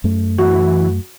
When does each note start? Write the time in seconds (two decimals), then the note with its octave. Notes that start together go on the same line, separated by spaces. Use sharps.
0.04 F#2 A3
0.38 E3 F#4